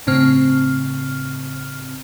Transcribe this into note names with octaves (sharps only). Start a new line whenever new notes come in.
G1 A2 C#3 C4 F6